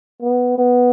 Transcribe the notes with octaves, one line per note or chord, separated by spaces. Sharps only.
B3
B3